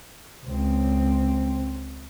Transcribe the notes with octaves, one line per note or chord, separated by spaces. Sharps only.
C#2 C4